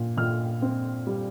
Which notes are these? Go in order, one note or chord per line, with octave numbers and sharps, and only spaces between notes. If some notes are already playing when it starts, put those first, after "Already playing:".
Already playing: A#2
A#2 F6
C4
G3